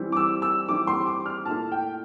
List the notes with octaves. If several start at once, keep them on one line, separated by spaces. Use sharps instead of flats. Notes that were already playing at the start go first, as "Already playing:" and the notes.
Already playing: E3 G3 C4 E4
D6
E6
E6
E3 G3 C4 E4 D6
C6
D6
F6
A#2 A3 E4 A5
G5